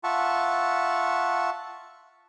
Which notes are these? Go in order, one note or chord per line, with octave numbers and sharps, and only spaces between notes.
F4 E5 F#5 A5 C#6